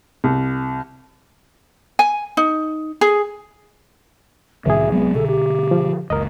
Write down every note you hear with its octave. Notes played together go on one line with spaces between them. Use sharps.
C2
G#5
D#4
G#4
C2 A2 D#3 G#4 E5
F#3 G#3 B3 C4
B2 D3 A4
G4
F3
F#1 C#2 A#4 D#5